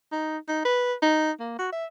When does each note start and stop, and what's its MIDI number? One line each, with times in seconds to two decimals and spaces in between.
0.12 0.38 63
0.49 0.65 63
0.65 0.94 71
1.02 1.31 63
1.40 1.55 58
1.59 1.69 66
1.73 1.86 76